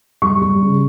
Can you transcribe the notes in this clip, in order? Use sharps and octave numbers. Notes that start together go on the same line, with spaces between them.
G3 C#6
G3
C#3